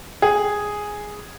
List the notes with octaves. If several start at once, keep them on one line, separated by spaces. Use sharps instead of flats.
G#4